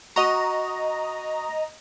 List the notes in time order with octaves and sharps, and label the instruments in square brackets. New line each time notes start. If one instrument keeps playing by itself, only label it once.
[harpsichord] F#4 [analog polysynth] D#5 A#5